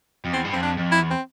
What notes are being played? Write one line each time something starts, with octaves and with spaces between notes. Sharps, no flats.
F2
E2 C4
G2
F2 C4
D4
F2
E4
E2
C4